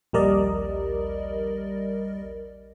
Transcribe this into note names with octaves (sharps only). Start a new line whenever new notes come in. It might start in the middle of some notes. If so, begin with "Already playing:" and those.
A#1 D#2 G3 A#4 D5 D#5